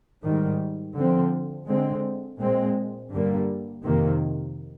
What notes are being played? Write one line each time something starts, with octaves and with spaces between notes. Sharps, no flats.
G#2 D#3 G3
D3 F3 C4
D3 G#3 C4
A#2 G#3 C4
G2 D3 G3 A#3
F2 C3 D#3 A#3